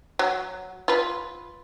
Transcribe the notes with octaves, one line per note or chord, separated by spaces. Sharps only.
F#3
F4 B4